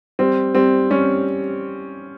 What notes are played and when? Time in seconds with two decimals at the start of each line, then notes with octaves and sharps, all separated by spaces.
0.19 G3 C4
0.55 G3 C4
0.90 G3 C#4